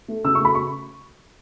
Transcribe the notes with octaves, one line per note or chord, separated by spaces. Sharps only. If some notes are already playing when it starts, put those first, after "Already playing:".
A3
C#3 E6
C#6
A3 B5
A3 C#6